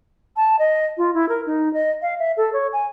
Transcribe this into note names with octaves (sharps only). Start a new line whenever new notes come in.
A5
D#5
F4
E4
A#4
D#4
D#5
F5
E5
A4
C#5
G#5